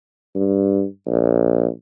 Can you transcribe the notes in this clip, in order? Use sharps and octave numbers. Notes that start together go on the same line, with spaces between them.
G2
A#1